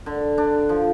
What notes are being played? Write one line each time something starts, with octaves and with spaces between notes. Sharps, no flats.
D3
D4
F3